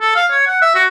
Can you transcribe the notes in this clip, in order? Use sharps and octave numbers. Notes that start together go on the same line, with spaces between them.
A4
F5
C#5
F#5
E5
F#4